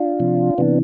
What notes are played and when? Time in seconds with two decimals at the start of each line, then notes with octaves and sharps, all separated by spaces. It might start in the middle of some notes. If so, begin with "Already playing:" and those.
Already playing: D4 F4
0.20 C3 F3
0.58 C3 E3 B3 D4